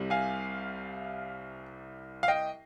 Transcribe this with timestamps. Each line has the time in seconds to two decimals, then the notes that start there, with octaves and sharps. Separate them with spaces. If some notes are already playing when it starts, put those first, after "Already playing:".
Already playing: C2 C3 G3
0.10 F5 G#5
2.23 F5
2.28 D#5 G5